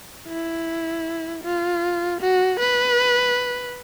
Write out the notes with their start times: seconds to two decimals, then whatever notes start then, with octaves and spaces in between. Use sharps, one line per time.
0.28 E4
1.44 F4
2.21 F#4
2.59 B4